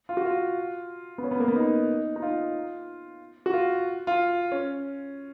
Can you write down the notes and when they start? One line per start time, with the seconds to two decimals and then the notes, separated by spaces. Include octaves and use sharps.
0.09 F4
0.17 F#4
0.26 F4
1.18 B3
1.24 C#4
1.31 B3
1.40 A#3
1.48 B3
1.56 D#4
2.16 D#4
2.22 F4
3.46 F#4
3.53 F4
4.07 F4
4.52 C#4